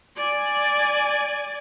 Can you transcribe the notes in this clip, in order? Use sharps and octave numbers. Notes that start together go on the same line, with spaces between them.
D5 G#5